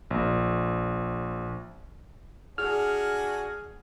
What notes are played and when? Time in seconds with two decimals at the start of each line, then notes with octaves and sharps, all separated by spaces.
0.11 A#1
2.58 D4 F#4 G#4 G#5 F6